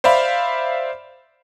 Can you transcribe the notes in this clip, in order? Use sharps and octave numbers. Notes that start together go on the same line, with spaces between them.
C5 D5 E5 F5 B5